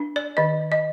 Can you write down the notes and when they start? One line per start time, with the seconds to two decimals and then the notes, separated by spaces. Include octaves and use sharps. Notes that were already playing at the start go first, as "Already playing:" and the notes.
Already playing: D4
0.16 D5
0.37 D#3 D#5
0.72 D#5